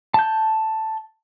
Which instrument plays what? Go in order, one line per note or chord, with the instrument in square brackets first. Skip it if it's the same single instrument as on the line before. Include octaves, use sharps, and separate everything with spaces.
[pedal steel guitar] A5 G6